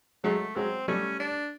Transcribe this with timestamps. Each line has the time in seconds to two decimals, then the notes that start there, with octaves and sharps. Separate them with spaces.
0.24 F#3 G#3 A3
0.56 F#3 G#3 C4
0.88 G3 A3 C#4
1.20 D4